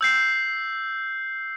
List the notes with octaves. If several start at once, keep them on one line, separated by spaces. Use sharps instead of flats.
E6 G6 C7